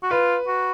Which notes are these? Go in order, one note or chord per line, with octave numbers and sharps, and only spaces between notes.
F#4
F4 B4
F#4